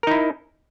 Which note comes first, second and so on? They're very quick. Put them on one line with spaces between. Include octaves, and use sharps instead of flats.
A#4 D#4 E4